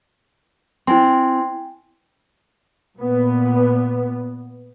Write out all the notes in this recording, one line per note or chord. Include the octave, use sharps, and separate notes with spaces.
C4 E4 G#5 C6
A#2 B3